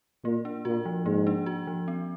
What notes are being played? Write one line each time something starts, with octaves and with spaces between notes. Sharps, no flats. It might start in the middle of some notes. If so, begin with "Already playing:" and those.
A#2 A#3
D4
A#2 F#4
F3
G#2 A#3
D4
F#4
F3
C4